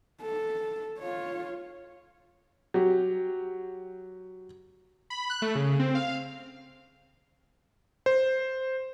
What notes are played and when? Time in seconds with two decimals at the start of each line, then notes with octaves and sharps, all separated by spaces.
0.23 A4
0.99 F4 C#5
2.74 F#3 G4
5.10 B5
5.30 F#6
5.42 A3
5.55 C#3
5.79 C4
5.95 F5
8.06 C5